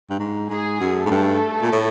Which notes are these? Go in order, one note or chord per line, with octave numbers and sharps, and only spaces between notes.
G2
G#2
G#2 G#4
F#2
A3 A4
G#2
G2
A#2
A2